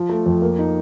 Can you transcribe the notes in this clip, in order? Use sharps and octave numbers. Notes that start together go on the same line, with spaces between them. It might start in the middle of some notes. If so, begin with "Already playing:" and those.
Already playing: F3
A3
F2
A#3
D#4